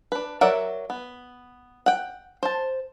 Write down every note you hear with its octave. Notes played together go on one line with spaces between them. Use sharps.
D4 B4
F#3 A#4 D5 E5 F#5
B3
F#5 G5
C5 A5